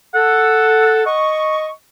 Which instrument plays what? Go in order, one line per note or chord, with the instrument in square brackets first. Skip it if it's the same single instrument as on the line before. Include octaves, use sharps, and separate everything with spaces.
[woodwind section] A4 [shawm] F#5
[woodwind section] D#5 C#6